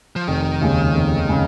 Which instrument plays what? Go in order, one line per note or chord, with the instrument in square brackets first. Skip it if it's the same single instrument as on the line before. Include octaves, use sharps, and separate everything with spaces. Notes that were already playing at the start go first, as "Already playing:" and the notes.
[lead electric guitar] F3
[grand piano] F1 [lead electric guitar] D#3
[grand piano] D#2 C#3 G#3
F1
C#3 G#3